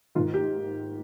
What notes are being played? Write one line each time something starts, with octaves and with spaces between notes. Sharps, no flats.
G#2 D#3 F4
G4